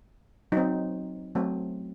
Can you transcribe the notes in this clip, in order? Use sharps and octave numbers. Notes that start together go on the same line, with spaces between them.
F#3 C4 D#4
F#3 A3 C4